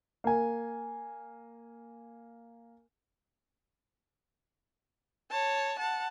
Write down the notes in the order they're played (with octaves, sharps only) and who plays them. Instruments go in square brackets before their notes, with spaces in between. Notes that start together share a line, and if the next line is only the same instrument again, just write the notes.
[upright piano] A#3 G#5
[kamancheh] C#5 A5
F#5 A5